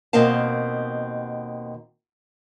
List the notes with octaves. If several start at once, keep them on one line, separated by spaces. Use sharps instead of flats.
D#2 B2 C4 A#4 F5 A5